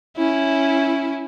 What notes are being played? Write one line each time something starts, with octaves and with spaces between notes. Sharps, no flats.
C#4 E4